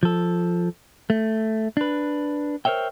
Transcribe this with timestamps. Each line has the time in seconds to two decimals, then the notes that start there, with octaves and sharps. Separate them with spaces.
0.03 F3 A4
1.10 A3
1.77 D4 B4
2.65 A#4 C5 C#5 E5 G5